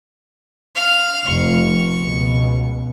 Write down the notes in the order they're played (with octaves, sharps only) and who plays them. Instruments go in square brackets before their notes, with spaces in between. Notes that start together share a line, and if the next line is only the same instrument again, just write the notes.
[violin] F5 F6
[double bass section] F1 F2 [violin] C#6
[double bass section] C#2 B2